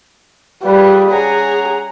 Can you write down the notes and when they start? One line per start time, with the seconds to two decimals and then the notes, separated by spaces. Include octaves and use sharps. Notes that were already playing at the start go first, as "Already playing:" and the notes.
0.63 G3 F4 G#4 B4
1.11 C#4 G#4 F#5 A#5